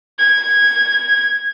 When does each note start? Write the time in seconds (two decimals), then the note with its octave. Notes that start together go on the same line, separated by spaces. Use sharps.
0.18 G#6